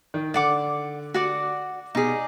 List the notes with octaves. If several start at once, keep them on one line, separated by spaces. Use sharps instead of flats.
D#3
D3 D5 F#5 D6
F#4 D5 F#5 D6
B2 D#4 G#4 D5